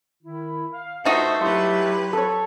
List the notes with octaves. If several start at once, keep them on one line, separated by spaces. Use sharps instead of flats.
D#3 E4
F5
A3 D#4 F4 F#4 B4 C5 D#6
F#3 E4 G4 B4 C6
A4 C#5